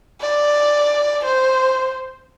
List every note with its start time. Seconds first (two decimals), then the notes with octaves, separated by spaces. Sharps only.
0.21 D5
1.25 C5